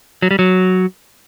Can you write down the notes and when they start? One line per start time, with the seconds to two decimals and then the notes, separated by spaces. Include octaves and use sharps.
0.22 F#3
0.31 G3
0.39 F#3